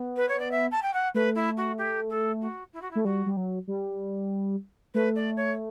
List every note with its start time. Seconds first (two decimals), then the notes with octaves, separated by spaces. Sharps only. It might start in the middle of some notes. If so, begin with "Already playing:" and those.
Already playing: B3
0.16 B4
0.29 C#5
0.39 D5
0.51 E5
0.71 A5
0.82 G5
0.94 F#5
1.14 A3 B4
1.35 E4
1.57 F#4
1.78 G4
2.10 A4
2.41 F#4
2.73 E4
2.82 F#4
2.91 E4
2.95 A3
3.05 G3 F#4
3.26 G3
3.37 F#3
3.67 G3
4.94 A3 B4
5.15 D5
5.37 C#5